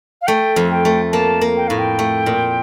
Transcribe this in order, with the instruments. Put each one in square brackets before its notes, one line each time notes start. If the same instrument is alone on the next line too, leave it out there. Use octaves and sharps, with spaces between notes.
[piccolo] F5
[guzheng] A3 [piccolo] G5
[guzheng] F2
[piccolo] G5
[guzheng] A3
[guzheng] A#3 [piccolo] A5
[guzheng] A#3
[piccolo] G5
[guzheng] A2 [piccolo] F5
[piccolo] G5
[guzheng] A3
A#2